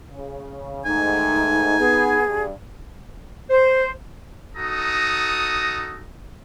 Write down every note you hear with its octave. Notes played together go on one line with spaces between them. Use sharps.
C#3
G#2 D#3 A3 D#4 G#5
B3 G#4
G2
C5
D#4 F#4 A4 A#5 D#6